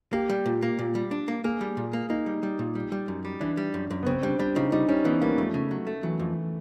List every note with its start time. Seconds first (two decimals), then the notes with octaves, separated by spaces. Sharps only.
0.13 A#3 G4
0.30 G3
0.46 A#2
0.62 A#3
0.79 A#2
0.95 G3
1.11 D4
1.28 A#3
1.44 A#3 G#4
1.61 G3
1.77 A#2
1.93 A#3
2.10 A#3 D#4
2.26 G3
2.43 G3
2.59 A#2
2.75 G3
2.92 G3
3.08 F#2
3.25 G3
3.40 E3 D4
3.57 G3
3.74 F#2
3.90 F#2
4.03 B3
4.06 C#3 C4
4.23 G3 D4
4.39 G3 D4
4.56 C#3 D#4
4.72 G3 D#4
4.88 G3 C#4
5.05 E3 B3
5.21 G3 A#3
5.38 F2 A3
5.54 C#3
5.71 F#3
5.87 A3
6.03 E3 F#3
6.19 F2